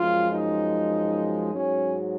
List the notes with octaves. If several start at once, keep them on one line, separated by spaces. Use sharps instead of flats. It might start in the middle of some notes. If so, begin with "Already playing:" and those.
Already playing: F#2 F3 G#3 F4
D#4
G#2 F#3 C#4